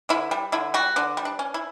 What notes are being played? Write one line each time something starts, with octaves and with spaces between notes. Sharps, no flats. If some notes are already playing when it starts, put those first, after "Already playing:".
D3 E4
G3
D3 E4
G3 F#4
D3 D4
G3
D4
C#4
E4